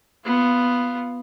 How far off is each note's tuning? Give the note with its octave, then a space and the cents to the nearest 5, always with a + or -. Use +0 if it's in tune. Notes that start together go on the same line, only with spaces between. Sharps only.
B3 +0 F4 +0